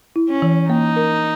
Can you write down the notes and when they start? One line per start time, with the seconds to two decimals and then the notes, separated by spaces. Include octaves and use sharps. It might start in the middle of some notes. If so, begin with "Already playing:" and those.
0.16 E4
0.29 C#4
0.42 E3
0.70 A#3 D#4
0.96 A#4